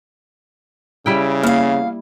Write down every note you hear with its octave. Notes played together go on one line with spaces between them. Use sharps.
C#3 G3 E4 G5
E2 A#3 F5